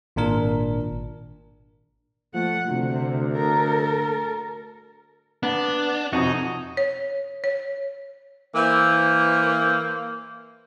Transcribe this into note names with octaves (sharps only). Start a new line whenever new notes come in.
G#1 A#2 D4 A#4
F3 A3 F#5
D2 C3
A4 A#4
B3 D4
F2 C3 D#4 F#4 G#4
C#5
C#5
E3 A#3 C5 F5